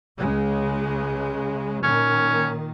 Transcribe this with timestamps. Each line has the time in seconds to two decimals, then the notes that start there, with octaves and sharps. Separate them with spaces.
0.17 C#2 C#3 G#3
1.83 A#2 D#3 C#4